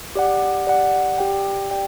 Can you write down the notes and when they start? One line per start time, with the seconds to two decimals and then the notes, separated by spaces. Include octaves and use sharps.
0.15 G4 D5 F#5
0.67 G4 D5 F#5
1.18 G4 D5 G5
1.71 G4 D5 G5